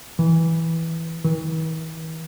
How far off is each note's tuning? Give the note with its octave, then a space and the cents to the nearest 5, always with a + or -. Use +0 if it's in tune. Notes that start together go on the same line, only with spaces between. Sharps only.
E3 -10
E3 -45